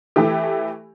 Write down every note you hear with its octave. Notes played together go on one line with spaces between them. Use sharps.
E3 A3 E4 G4